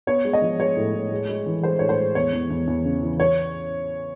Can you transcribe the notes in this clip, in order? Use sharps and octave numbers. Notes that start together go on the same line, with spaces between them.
B3 C#5
G#3
D#5
F3
G#3 C#5
A2
A2
G#3
G#3
E3
G#3 C5
A2 C#5
C5
G#3
E2 C#5
E2
E2
E2
C#3
E3
C#5